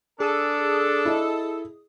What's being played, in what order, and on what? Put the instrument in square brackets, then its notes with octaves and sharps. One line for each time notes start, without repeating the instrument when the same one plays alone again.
[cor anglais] D4 [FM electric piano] G#4 D#6 [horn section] A4
[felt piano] E4 D#5